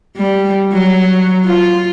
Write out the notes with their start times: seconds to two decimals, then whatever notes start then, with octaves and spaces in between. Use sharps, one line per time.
0.17 G3
0.73 F#3
1.45 F4